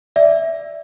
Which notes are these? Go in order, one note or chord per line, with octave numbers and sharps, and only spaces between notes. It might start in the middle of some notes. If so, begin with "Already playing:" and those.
D5 E5